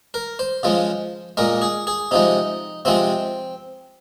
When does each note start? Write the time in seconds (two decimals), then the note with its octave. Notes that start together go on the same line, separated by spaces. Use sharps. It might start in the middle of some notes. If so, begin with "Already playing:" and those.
0.14 A#4
0.39 C5
0.63 C#3 F3 G#3
1.37 A#2 G#3 A#4
1.62 G#4
1.87 G#4
2.11 C3 F3 G#3 D#4
2.85 C3 F3 G#3 C4